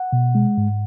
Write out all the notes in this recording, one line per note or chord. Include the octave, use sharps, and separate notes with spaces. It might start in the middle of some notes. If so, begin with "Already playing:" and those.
Already playing: F#5
B2
G#3
G#2